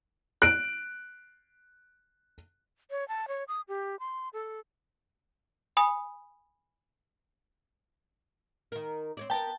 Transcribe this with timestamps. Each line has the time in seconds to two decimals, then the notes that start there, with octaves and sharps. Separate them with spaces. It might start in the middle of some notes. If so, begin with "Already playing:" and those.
0.42 F#6 D7
2.91 C#5
3.08 A5
3.28 C#5
3.48 D#6
3.68 G4
4.00 C6
4.33 A4
5.77 G#5 B5 D#6
8.72 D#3 A#4
9.17 C4 C#5 D5
9.30 B3 A#4 G5 A5